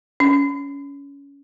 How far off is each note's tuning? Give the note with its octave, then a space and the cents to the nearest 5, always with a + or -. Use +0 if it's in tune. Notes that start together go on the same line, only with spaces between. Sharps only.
C#4 +20